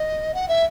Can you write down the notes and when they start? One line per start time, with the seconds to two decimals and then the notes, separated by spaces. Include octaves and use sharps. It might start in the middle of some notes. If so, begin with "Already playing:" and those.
Already playing: D#5
0.34 F#5
0.48 E5